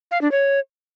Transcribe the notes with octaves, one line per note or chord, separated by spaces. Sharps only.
F5
D4
C#5